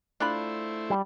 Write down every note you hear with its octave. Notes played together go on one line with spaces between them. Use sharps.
A3 D4 E4 F4 C5 B5
G3